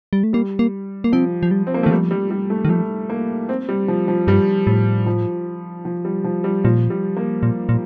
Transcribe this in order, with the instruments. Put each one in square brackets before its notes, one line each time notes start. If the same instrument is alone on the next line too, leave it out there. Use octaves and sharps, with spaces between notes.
[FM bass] G3
A3
[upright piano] G3 [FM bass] A#3
[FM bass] A#3
A#3
[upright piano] F3 [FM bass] C4
[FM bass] F3
G3
[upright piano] C4
A#3
[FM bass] D#3 [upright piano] A3
[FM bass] F3 [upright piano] G3
[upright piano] G3
G3
A3
[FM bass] D#3
[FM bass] F3 [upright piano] A3
[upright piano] A#3
C4
G3
F3
F3
[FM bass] G2 [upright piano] G3
[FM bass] A2
[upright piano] F3
F3
G3
F3
G3
[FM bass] A#2 [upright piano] F3
[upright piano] G3
A#3
[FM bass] A#2
A#2